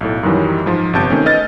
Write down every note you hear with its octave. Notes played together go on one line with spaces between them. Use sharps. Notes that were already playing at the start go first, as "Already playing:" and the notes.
B1 A2 A4
F#2 D#3 E3 F#3 G3
G#2 F3
G1 C3 A5 G6 D7
D#3 A3 C4 C#4
A4 B4 D#5 F6 A6